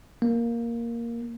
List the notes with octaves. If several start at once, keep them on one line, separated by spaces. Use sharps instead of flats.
A#3